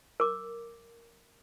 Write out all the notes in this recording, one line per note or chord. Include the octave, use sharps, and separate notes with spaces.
A#4 D6